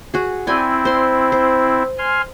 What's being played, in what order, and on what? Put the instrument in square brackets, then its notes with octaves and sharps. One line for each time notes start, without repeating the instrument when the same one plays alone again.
[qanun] F#4 G#4
[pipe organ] C4 E4 [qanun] D5 G5 G#5
[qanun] C5 C6
C5
[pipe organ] G#5 C6 F6